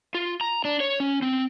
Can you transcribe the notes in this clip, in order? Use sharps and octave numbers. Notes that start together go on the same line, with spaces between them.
F4
A#5
D4
C#5
C#4
C4